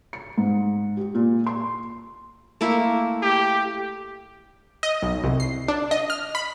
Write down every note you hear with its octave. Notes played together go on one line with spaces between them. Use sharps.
C#7
G#2
G4
A#2
C6
A3 A#3 E4
G4
D#5
B1
C2
C7
D4
D#5
F6
B5